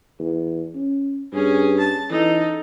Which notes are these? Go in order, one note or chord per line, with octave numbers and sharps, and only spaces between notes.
E2
C#4
G2 C#4 G#4
A5
E3 D#4 A4